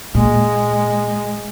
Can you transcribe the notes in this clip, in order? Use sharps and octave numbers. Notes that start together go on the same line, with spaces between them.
A#2 G#3 A#3